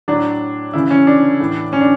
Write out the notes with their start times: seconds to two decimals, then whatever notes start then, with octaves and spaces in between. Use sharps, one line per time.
0.08 A2 F#3 D4
0.73 C#3 E3 E4
0.90 C#4
1.07 D4
1.40 A2 E3
1.73 C#4
1.81 D4